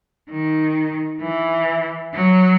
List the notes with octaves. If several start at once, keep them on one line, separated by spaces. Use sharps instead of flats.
D#3
E3
F#3